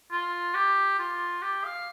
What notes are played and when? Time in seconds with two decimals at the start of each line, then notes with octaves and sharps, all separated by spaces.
0.11 F4
0.55 G4
0.99 F4
1.42 G4
1.65 F5